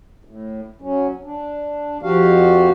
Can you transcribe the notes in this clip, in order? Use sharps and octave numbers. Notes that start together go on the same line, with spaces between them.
A2
F#3 C#4
D4
F2 F3 F#4 G4 F5